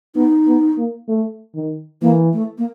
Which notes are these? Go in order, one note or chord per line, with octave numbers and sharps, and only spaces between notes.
B3 D#4
B3
A#3
A3
D#3
E3 A#3
A3
A#3